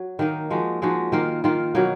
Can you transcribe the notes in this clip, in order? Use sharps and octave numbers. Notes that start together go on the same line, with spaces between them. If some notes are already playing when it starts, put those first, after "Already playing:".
Already playing: F#3
D#3 A#3 D#4
F3 G#3 D#4 F#4
F3 G#3 D#4 F#4
D#3 A#3 F4
D#3 A#3 F4
B2 F#3 A#3 D#4